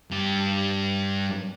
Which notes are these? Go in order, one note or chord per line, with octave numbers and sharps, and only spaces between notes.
G2 G4